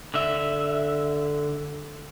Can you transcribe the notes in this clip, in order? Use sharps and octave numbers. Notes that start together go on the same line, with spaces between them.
D3 E5